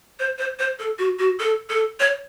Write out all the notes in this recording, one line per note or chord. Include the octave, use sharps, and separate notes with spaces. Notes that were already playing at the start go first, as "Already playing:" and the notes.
C5
C5
C5
A4
F#4
F#4
A4
A4
C#5